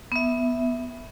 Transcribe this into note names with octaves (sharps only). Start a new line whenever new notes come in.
B3 E5